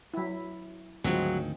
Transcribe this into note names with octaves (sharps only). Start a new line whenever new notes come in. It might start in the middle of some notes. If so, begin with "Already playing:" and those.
F#3 E4
D2 G#2 D#3 F3 F#3 G#3 C4